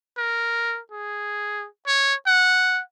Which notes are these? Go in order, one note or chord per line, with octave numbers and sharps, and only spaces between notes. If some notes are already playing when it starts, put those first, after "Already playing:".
A#4
G#4
C#5
F#5